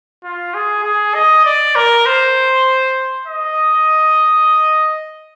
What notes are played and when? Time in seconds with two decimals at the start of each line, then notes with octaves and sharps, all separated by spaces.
0.24 F4
0.54 G#4
0.84 G#4
1.15 D#5
1.45 D5
1.76 A#4
2.06 C5
3.27 D#5